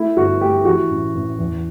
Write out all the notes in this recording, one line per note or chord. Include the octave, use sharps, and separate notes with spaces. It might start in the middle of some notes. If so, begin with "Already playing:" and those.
Already playing: A3 E4
G1 F#4
A3 G4
E3 F#4
A1
A1
E2